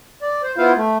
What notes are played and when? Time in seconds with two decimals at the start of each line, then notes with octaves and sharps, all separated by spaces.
0.22 D5
0.44 C5
0.58 B3 E4 F4 C5 F5
0.76 A3